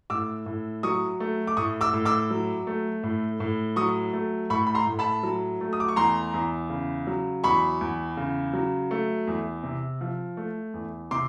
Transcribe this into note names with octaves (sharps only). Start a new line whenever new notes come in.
A2 D6 E6
A2
F#3 C#6 D#6
A3
D6
A2 C#6 D#6
D6 E6
A2
D6 E6
F#3
A3
A2
A2
F#3 C#6 D#6
A3
A2 B5 C#6
B5
A#5 C6
A2
A5 B5
F#3
A3
D#6
D6
C#6
E2 A#5 C6
E2
C#3
F#3
E2 B5 C#6
E2
C#3
F#3
A3
E2
C3
F3
A3
E2
C3 C6 D6